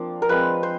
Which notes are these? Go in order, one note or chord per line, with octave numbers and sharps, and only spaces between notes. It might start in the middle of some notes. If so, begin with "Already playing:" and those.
Already playing: F3 A#3 C4 D4
A#4
F3 G#3 C4 B4
C5